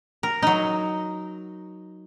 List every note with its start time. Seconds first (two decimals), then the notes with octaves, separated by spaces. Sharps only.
0.23 A#4
0.42 F#3 D#4